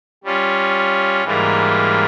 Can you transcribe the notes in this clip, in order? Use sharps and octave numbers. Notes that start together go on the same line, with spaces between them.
G3 C#4 F4
G#2 E3 G3 A#3 F4